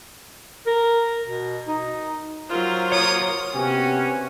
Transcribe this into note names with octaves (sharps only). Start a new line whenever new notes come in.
A#4
B2
D#4
F#3 F4 A#4 C5
A#3 C#5 D#6
C3 B3 C#4 F#4